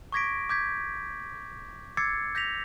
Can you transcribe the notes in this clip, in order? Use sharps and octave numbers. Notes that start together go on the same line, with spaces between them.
C#6 D6 G#6 A#6 B6 D7
D6 G6 G#6 B6
D6 E6 G#6 A6 C7 C#7
G6 A#6 B6 F7